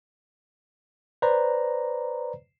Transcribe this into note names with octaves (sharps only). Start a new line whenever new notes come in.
B4 C5 D5 A#5